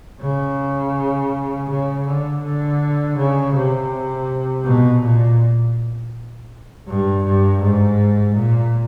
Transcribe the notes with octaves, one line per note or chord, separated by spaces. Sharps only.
C#3
C#3
D3
D3
C#3
C3
B2
A#2
G2
G2
G#2
A#2